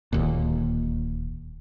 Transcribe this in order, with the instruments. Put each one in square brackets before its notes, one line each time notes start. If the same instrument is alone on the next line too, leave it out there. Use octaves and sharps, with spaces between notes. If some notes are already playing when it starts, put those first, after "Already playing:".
[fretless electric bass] D1 D#2 A#2